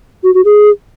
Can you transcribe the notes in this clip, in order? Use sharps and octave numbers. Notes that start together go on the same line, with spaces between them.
F#4
F#4
G#4